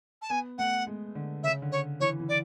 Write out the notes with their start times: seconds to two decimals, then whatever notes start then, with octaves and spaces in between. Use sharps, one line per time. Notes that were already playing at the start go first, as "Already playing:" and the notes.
0.22 A5
0.30 B3 G#5
0.58 A3 F#5
0.87 G#3
1.15 D3
1.43 C#3 E5
1.62 D3
1.72 C#5
2.00 E3 C#5
2.20 E3
2.29 D5